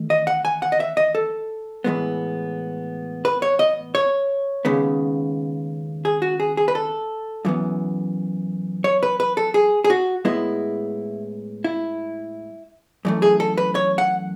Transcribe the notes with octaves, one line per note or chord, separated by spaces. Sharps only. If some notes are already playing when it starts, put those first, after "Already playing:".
Already playing: E2 D#3 A3
D#5
F#5
G#5
F#5
D#5
E5
D#5
A4
A2 E3 G#3 B3
B4
C#5
D#5
C#5
D#2 C#3 G#3 B3
G#4
F#4
G#4
G#4
B4
A4
F#2 E3 B3
C#5
B4
B4
A4
G#4
G#4
F#4
A2 G#3 B3 E4
E4
F#2 E3 A3
G#4
A4
B4
C#5
F#5